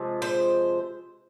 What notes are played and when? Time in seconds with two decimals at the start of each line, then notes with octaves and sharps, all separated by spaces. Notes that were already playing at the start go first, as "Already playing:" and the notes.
Already playing: C3 F3 G#3
0.22 C5